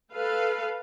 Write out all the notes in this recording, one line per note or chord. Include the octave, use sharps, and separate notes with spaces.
A4 B4 F5